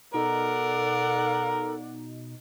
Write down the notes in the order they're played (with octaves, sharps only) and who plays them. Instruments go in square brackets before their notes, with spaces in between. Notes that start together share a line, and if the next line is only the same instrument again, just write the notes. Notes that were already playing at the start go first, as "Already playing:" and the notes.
[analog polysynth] B2 D#4 [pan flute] A4 [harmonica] A#4 [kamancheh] D5 F#5